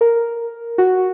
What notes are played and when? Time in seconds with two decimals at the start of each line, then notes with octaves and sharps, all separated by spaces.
0.01 A#4
0.78 F#4